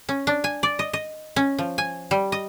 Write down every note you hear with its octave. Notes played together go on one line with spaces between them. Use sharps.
C#4
D4
G#5
D5
D#5
D#5
C#4
F3
G#5
G3
D#5